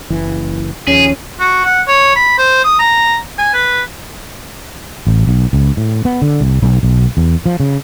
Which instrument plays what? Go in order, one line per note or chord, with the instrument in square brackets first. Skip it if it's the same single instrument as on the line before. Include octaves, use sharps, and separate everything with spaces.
[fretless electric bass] F#1 E3
[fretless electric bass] D#2 F3 [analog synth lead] C#4 [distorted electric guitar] G#4
[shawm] F#4
F#5
C#5
B5
C5
D#6
A#5
G#5
B4
[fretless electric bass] A1
B1
C#2
A2
B3
D3
C2
B1
B1
E2
F3
C#3